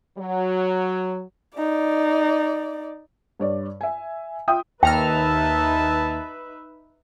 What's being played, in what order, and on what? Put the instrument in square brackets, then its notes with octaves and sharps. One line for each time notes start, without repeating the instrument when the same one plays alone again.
[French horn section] F#3
[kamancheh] D#4 D5
[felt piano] G2 C#5 D5
E5 G#5
F4 E5 G5 D#6
[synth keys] D#2 A#5 F6 [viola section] D#4 B4 E5 [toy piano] G5 [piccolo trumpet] A5